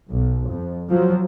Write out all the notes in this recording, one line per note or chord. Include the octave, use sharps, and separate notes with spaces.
B1
F2
F3 F#3